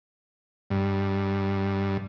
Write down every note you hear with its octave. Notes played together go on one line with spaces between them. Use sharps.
G2